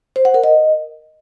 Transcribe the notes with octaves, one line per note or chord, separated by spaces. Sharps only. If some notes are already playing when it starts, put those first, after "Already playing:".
C5
F#5
A#4
D#5